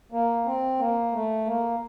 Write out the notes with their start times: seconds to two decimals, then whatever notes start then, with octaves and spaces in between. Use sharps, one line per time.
0.12 A#3
0.45 C4
0.79 A#3
1.13 A3
1.46 A#3